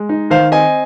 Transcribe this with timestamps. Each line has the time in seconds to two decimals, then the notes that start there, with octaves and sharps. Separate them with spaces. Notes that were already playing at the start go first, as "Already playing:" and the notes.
Already playing: G#3
0.09 D#4
0.30 D#3 C5 F5
0.52 C4 D#5 G#5